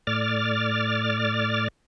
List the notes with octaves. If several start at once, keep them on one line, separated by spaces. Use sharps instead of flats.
A2 D5 F6 A6